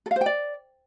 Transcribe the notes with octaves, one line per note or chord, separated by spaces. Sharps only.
A4
F5
C5
G5
D5